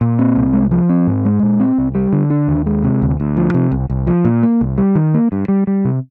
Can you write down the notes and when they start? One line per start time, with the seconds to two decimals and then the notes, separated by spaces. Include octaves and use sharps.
0.01 A#2
0.19 C4
0.36 C2
0.53 G#3
0.71 F3
0.89 C4
1.07 G#2
1.25 G#3
1.43 A#2
1.60 C4
1.78 C2
1.95 G3
2.13 D3
2.30 D4
2.48 D#2
2.66 G#3
2.84 C3
3.02 D2
3.20 D2
3.37 F3
3.54 C3
3.72 C2
3.90 C2
4.07 F3
4.25 A#2
4.43 A#3
4.61 C2
4.78 G3
4.95 D#3
5.14 A#3
5.32 G2
5.48 G3
5.67 G3
5.85 C3